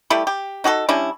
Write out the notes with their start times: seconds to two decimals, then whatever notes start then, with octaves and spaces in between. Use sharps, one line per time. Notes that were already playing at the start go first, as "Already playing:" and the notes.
0.10 G3 A3 E4 G4
0.27 G4
0.64 D#4 F#4 G#4 A4
0.89 G3 C#4 D4 E4